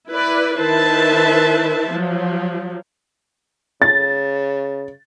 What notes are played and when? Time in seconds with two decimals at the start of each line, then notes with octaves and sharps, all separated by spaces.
0.10 E4 B4 D5
0.60 D#3 E4 B4 C5 E5 A5
1.93 F3 F#3
3.82 C#3 A6